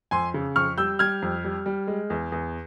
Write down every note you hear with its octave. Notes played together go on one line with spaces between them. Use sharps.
F2 G#5 C6
C#3
F2 C#6 F6
G3 E6 G6
G3 F6 G#6
F2
G3
G3
G#3
E2
E2